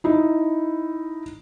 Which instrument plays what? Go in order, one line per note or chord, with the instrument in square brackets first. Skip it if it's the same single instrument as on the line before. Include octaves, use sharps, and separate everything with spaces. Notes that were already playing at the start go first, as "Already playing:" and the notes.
[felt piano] D#4 E4